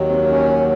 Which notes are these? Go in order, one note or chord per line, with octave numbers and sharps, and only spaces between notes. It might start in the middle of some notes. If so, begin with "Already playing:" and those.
Already playing: D#2 D#3 F#3
C4
C#4